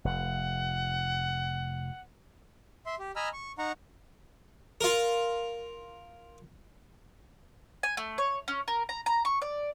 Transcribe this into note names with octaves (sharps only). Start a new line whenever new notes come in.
F1 F#5
E5 C6
G4
D#5 G#5 A#5 B5 E6 F6
C#6
D#4 F#5 A#5 C#6
F4 A#4
G#5
A3
C#5
C#4
A#4
A#5
A#5
C#6
D5